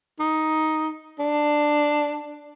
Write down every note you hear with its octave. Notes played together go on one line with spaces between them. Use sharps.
D#4
D4